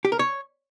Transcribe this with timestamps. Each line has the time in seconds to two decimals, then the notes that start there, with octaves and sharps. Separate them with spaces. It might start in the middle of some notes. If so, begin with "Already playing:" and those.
0.05 G4
0.12 A#4
0.19 C#5